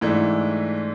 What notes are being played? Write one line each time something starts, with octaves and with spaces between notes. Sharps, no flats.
G#2 E3 A3 D4